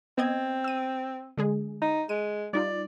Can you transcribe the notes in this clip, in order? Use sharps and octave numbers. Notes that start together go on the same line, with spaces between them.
B3 C4 D#5 G#6
E6 D#7
D3 G#3 G#4
D#4
G#3 D#7
G3 D#4 F4 D5